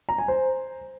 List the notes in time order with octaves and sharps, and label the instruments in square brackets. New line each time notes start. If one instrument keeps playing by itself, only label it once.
[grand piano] A#5
G#5
C5